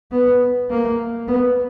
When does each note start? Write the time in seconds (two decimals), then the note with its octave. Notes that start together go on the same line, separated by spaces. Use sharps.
0.12 B3
0.71 A#3
1.28 B3